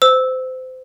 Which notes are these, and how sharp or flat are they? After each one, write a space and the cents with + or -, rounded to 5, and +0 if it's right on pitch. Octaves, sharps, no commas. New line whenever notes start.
C5 -25 E6 -10